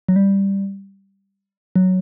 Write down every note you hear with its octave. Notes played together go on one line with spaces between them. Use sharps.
F#3
G3
F#3